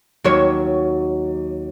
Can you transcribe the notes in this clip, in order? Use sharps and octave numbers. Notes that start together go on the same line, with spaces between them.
D#2 F#3 C#5